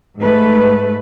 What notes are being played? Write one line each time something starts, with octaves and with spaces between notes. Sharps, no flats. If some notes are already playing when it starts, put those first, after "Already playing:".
G#2 A3 B4